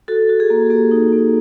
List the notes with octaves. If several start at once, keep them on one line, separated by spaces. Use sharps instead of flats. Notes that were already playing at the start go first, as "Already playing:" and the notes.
F#4 A4
F#4
G#4
A#3
A#3 G4
D#4
A#3